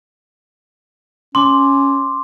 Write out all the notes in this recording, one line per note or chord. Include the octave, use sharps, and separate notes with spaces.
C#4 C6 D6